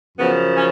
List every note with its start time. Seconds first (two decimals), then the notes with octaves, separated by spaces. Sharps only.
0.17 F#2 C#3 F3 B3
0.55 C#4